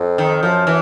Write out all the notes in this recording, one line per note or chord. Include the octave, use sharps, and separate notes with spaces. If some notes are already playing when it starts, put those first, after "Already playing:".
Already playing: F2
D#3
F#2 F3
E3